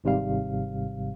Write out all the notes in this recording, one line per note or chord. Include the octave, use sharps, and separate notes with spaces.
G#1 G#2 C3 G3 F5